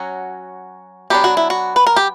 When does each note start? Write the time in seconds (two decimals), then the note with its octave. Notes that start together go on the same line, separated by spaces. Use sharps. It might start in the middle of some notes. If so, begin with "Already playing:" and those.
Already playing: F#3 C#4 F#4
1.10 F#3 B3 D4 G4
1.24 F#4
1.37 E4
1.50 F#4
1.76 B4
1.87 A#4
1.96 G4